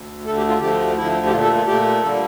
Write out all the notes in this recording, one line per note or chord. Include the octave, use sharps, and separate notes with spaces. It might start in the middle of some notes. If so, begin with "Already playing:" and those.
Already playing: D2
D2 D3 A3 A4
G4
F4
D2 D3 F3 A3 G4
D2 D3 F3 A3 E4
G4
A#2 A3 F4
A4
F4
A#2 A3 G4
D3 G3 A#3 A4